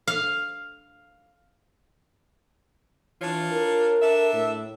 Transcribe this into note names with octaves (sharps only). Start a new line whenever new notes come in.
F5
E3 D4 F4 C#5
A#4
D4 A4 E5
A2